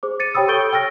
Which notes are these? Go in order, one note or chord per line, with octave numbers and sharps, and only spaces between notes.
G#4 C5 D6
A6 C#7 D#7
G4 C#5 G5 B5 D#6 E6
A4 C#6 G6 A6 D7 G7
G5 E6 F6 A#6